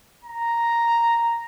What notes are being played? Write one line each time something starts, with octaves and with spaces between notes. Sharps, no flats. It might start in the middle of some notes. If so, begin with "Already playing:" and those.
A#5